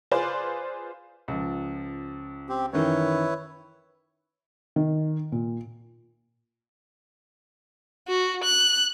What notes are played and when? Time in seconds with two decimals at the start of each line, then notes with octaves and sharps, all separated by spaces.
0.11 F4 G#4 B4 C5 D5 C6
1.28 C#2 F3
2.49 C4 G4
2.73 F#2 D#3 E3 E4 B4 C#5
4.76 D#3
5.32 A#2
8.08 F#4
8.44 F#6